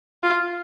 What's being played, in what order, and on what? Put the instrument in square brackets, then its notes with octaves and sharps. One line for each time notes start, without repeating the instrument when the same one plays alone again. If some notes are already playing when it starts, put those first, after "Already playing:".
[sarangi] F4